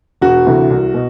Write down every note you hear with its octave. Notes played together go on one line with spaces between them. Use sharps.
E1 F#4
D2 C3 E3
C2
B2